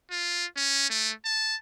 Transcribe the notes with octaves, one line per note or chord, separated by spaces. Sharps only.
F4
C#4
A3
A5